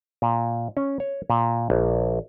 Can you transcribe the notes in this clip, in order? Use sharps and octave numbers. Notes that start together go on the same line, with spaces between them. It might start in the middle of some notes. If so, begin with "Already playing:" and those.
A#2
C#4
C#5
A#2
A#1